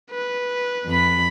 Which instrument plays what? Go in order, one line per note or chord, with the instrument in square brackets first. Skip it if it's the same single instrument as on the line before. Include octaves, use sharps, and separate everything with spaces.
[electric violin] B4
[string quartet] F2 B5